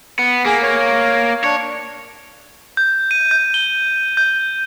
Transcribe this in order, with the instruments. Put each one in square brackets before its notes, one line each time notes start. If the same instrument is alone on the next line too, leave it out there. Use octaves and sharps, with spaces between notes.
[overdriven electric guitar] B3
[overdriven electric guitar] A#3 [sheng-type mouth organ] G#4
[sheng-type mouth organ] C#5
[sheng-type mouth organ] D4 [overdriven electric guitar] C#5
[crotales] G6
D#7
G6
G7
G6